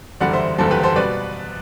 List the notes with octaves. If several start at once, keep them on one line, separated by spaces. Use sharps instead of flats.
F#1 E2 D3 G3 D5 F#5
C5 E5
F#1 E2 D3 G3 A4 C5
G4 B4
A4 C5
B2 G3 B4 D5